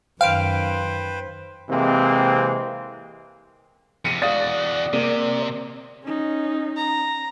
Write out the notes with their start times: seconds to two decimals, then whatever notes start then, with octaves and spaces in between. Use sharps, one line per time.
0.21 F#2 D#3 B4 C5 F5 G5 D7
1.70 C3 E3 G#3 A#3 C4
4.05 F2 C3 C#7 D#7
4.22 E2 F#4 D5 F5 D#6 A6
4.93 C3 A#3
6.03 C#4 D#4
6.77 A#5